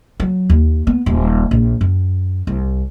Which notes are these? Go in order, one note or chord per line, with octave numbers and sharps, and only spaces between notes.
F#3
D#2
B3
D#1
A#1
F#2
C2